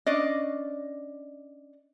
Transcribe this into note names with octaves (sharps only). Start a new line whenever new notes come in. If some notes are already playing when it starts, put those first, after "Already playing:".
C#4 D4 D5 D#5